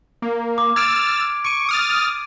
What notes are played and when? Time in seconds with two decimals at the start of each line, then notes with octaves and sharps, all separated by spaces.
0.22 A#3
0.58 D6
0.76 E6 F6 G#6 A6 D7
1.44 C#6 D7 D#7
1.69 D#6 F6 A6